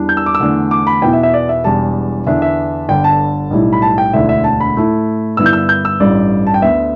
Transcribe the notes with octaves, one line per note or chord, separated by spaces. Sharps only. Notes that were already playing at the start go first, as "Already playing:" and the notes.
Already playing: E2 E3 G3 D4
G6
E6
D6
E6
E2 D3 A3 D4
D6
B5
E2 B2 B3 E4 G5
E5
E5
D5
E5
E1 E2 E3 G3 A5
E2 D3 B3 D4 E5
E5
G1 G2 D3 G5
A5
B1 A2 G3 E4
B5
A5
G5
E1 D2 D3 A3 E4 E5
E5
A5
B5
A2 A3 E4
G2 D3 B3 E4 E6
G6
E6
G6
E6
A1 G2 G3 D4 D5
A5
G5
D2 D3 B3 E5